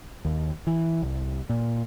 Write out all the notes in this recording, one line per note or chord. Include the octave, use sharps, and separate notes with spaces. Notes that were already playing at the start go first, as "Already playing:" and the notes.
D#2
E3
C2
A#2